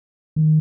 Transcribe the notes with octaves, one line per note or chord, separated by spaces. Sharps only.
D#3